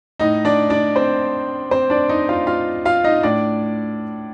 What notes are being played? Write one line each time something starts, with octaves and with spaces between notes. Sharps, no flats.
A2 D#4 D#5
D4 D5
D4 D5
C4 C5
C4 C5
D4 D5
D#4 D#5
F4 F5
F4 F5
F4 F5
D#4 D#5
A2 D4 D5